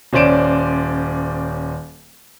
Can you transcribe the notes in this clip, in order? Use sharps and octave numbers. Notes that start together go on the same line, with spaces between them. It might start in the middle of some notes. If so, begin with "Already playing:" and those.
D#1 C#4 C5 D5 D7 E7